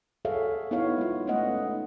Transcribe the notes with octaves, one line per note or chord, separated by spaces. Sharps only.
F#4 G#4 A4 C#5 E5 F5
B3 D#4 E4 F#4 C#5 F5
G#3 F4
A3 B3 C#4 F4 D#5 F#5
D#4